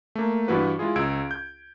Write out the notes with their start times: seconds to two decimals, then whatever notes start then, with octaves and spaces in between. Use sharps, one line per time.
0.15 A3 A#3
0.48 G2 E3 E4 F#4 B4
0.79 G#3 E4 F4 G#4
0.96 C#2 E6 G#6 D7
1.31 G6